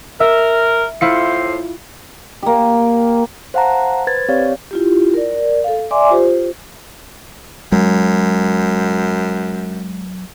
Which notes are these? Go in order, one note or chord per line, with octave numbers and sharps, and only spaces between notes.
A#4 E5
A2 E4 F4 C5 C#7
A#3 G4
C5 F5 F#5 A5 A#5
B4 C5 G#6 A6
C4 G4 C#5 D5 F5
E4 F4 G4
A#4 D5
A4 F5
D5 E5 G#5 C6 D6
F4 G4 C5
F#2 F#3 G#3